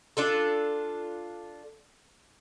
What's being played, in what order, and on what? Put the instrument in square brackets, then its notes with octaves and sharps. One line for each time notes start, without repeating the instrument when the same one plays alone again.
[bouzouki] D4 F4 A4